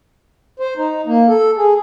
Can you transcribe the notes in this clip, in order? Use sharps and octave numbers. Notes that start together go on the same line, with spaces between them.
C5
D#4
A#3
A4
G#4